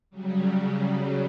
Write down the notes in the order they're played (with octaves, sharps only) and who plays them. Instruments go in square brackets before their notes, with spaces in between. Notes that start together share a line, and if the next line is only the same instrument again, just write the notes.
[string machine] C#3 F#3 G3